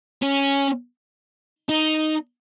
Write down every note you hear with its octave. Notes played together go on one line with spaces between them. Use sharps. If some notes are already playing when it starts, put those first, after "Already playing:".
C#4
D#4